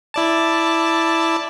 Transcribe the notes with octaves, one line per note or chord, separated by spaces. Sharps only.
E4 D5 A5